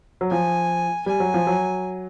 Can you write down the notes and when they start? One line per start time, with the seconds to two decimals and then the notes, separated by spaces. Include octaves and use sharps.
0.21 F#3
0.31 F3 G#5
1.06 G3 G#5
1.20 F#3
1.34 F3
1.47 F#3